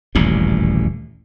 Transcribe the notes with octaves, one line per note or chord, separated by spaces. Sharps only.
D#1 A1 D2 G2